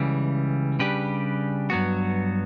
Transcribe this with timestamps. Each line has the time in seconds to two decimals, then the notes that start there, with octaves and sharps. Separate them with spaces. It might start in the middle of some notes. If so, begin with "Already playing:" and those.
Already playing: C#2 C#3 E3 G3
0.79 C#3 G3 D4 G4 B4
1.70 G2 F#3 B3 F#4